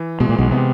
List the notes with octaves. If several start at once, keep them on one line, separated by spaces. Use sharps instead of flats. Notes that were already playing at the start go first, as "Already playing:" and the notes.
Already playing: E3
B2 G#3
A#2
B1 B2
C3 B3